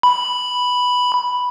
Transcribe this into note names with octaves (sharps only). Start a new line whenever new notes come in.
B5